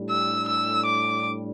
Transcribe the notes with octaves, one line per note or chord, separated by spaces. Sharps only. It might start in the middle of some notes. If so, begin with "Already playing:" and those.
Already playing: A2 G3 D4
E6
E6
D6